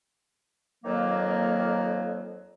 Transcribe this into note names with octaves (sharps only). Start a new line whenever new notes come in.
F2 D#3 F#3 A#3